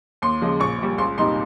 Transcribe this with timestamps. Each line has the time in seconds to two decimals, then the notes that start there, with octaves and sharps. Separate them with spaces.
0.22 D#2 C6
0.41 C#3 F3 G#3
0.60 A#1 C#6
0.79 A#2 G3
0.98 C#2 C6
1.18 C3 G3 A#3 D#4 C6